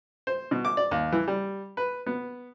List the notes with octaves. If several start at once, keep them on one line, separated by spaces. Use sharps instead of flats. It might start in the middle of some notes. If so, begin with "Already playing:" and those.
C5
B2
D6
D5
D#2
E3
G3
B4
B3